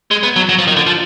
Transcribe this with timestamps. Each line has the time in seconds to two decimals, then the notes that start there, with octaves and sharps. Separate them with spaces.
0.11 G#3
0.23 B3
0.36 F#3
0.49 F#3
0.59 F3
0.68 D#3
0.76 D3
0.87 F3